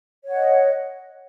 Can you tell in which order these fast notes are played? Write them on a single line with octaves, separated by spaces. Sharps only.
C#5 F#5 D#5